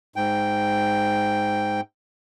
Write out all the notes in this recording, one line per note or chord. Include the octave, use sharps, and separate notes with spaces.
G#2 G5